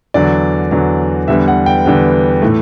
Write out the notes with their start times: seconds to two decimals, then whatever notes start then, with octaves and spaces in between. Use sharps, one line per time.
0.14 E2 D3 F#3 D5
0.71 E2 D3 F#3
1.28 E2 D3 G3 B3 E5
1.48 F#5
1.66 G5
1.85 E2 D3 G3 B3
2.42 A2 E3 A3